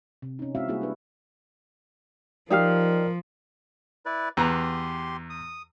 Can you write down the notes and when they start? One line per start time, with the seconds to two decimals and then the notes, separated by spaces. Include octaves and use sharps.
0.22 C3
0.39 C#4 D#4
0.55 G#3 C4 E4 F#4 E5 F5
0.68 G3 A#3 E4 F#4 G#4
0.82 D4 B4
2.50 F3 D#4 G4 A#4 D5 F5 G5 F6
4.06 E4 B4 D5
4.37 E2 G4 B4 A#5 C6
5.30 D#6